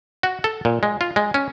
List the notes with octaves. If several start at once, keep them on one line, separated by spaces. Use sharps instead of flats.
F#4
A4
A#2
G#3
F4
G#3
C#4